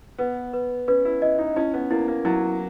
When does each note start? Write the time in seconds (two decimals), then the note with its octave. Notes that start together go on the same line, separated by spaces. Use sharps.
0.18 B3 B4
0.53 B4
0.88 C#4 B4
1.05 E4
1.22 E4 D#5
1.39 D#4
1.56 C#4 E4
1.74 B3
1.91 A#3 E4
2.08 A#3
2.25 F#3 E4